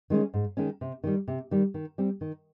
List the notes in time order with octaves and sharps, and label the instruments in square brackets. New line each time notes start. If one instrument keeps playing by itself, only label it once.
[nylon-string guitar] D#3 G#3 C#4
G#2
D#3 G#3 C#4
C3
D#3 G3
C3
D#3 G3
D#3
G3 C4
D#3